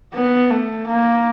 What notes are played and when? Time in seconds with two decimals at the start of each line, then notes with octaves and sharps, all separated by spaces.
0.14 B3
0.50 A3
0.87 A#3